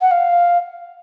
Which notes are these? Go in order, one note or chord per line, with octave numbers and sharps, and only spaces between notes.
F#5
F5